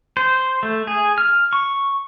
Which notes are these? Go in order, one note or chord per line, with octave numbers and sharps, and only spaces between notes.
C5
A3
G#4
F6
C#6